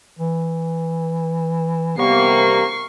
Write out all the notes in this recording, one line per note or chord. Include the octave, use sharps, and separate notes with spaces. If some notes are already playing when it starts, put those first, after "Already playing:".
E3
C3 G3 A#3 B3 C#6 C7